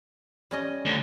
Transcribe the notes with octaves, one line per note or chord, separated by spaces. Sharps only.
G3 C#4 D#5
D2 D3